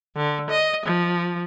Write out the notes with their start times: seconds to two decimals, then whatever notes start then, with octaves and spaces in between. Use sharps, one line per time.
0.16 D3
0.50 D#5
0.86 F3